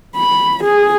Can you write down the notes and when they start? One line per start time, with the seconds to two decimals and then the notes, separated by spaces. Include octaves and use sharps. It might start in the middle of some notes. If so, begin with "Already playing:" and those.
0.16 B5
0.64 G#4